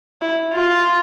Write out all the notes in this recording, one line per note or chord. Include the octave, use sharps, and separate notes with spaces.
E4
F4